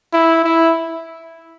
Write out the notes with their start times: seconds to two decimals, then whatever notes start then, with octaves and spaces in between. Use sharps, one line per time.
0.13 E4
0.44 E4